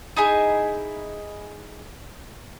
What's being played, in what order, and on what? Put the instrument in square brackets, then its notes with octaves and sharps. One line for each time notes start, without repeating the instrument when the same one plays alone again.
[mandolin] D#4 E4 G#4